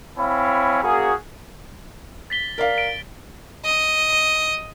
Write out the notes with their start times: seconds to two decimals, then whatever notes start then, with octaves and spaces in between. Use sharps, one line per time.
0.18 C4 E4 C#5 F5 G#5 B5
0.83 A#3 C#4 F#4 G#4
2.30 A6 B6 G7
2.58 A#4 D5 F5
2.78 D7
3.65 D#5